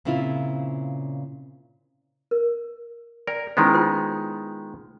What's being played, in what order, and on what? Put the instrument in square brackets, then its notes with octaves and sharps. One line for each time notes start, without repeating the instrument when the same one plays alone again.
[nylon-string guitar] A#2 C#3 B3 C4 E4 F4
[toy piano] A#4
[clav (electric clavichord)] A#4 [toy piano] D5 G5
[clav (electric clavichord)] D#3 G#3 B3 [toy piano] C#4 E4 C5
[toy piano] F4 C5 G5